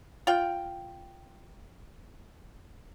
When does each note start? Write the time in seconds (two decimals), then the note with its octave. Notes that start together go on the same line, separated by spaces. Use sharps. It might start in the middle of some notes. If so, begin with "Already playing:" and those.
0.27 F4 G5